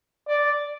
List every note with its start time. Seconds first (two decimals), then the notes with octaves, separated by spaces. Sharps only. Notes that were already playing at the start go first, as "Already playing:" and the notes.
0.28 D5